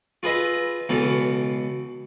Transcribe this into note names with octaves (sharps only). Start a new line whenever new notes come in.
F4 G#4 B4 D#5 E5
C#2 B2 E3 A4